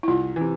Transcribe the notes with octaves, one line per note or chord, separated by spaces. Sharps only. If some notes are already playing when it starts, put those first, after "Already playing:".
E4
C2 F4
C3 E3